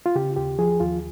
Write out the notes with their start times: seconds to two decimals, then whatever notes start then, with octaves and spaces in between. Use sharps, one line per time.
0.06 F4
0.15 C#3 G4
0.36 D#2 G4
0.59 F3 G#4
0.80 D#2 F4